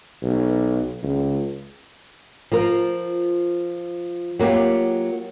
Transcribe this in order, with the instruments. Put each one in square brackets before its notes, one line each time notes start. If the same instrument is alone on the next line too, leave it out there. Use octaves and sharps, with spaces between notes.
[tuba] B1
C#2
[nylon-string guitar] F3 F4 A#4
F#3 A#3 F4 G4